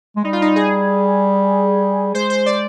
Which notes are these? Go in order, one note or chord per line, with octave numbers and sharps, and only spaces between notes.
G#3
G3 D#4
F4
D#4
G#4
G#3 C5
C5
D5